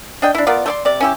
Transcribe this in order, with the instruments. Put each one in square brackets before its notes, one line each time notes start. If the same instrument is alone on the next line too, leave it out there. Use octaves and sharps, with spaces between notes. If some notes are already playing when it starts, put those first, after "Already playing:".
[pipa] D4 D#5 G5
D4 E4
B3 F4 A#4 D5
A3 D5 C6
C3 D5
C#4 E4 G4